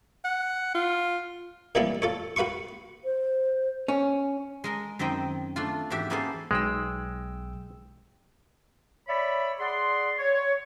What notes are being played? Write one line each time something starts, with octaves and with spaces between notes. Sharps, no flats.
F#5
F4
A#2 E3 F3 G3 B3 C4
F4 A4 C#5
F#4 B4 F5 C6 C#6
C5
C#4
G#3 A#4 D#5
F#2 D#3 C4 C5 D#5 G5
A3 D4 F4
E2 G#2 F#4 G4 E5
A#3 B3 C#4 G#4 A4 C5
B1 G#3 G5 E6
C#5 D5 E5 B5
G#4 D5 F#5 C6
C#5